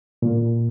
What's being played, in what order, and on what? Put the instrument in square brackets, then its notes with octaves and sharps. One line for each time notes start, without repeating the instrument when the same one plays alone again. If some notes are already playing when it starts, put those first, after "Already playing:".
[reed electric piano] A#2